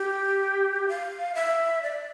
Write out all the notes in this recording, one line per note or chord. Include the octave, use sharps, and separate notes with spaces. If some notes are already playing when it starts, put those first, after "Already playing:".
Already playing: G4
F5
E5
D5